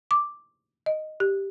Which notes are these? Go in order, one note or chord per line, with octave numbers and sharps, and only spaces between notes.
D6
D#5
G4